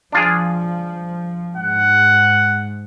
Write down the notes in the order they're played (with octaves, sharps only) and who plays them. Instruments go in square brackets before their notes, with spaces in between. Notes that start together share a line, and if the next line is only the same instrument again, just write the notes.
[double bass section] F3 [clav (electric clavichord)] D4 F4 G#4
[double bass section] G#2 [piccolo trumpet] F#5